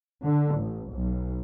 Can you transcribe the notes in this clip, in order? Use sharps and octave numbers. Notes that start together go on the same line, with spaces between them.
D3
A1
B1